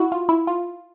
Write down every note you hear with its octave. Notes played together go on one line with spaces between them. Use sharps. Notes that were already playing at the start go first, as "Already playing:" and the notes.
Already playing: E4 F#4
F4
E4
F4